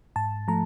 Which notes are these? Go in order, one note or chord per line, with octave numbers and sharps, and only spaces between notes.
G#2 A5
F3 A3 A#5